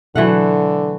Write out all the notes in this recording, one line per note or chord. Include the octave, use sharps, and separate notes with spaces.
B2 D3 E3 F#3 A3 F#5